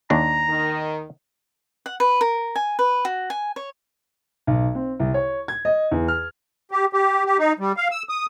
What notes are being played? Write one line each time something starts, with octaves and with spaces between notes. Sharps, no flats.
D#2 D4 A#5
D#3
F#5
B4
A#4
G#5
B4
F#4
G#5
C#5
B1
C4
C2
C#5
G#6
D#5
E2
F6
G4
G4
G4
D#4
G3
F5
E6
D#6